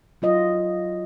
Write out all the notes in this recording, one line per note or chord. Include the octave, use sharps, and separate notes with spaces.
F#3 F4 D#5